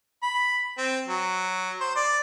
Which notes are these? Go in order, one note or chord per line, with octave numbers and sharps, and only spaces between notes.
B5
C4
F#3
C5
D5